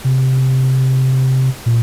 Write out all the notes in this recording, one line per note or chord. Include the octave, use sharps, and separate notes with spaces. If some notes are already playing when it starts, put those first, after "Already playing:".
C3
A#2